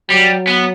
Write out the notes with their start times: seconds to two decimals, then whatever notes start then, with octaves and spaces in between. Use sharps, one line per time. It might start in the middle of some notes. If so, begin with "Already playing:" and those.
0.09 F#3 G3
0.48 B3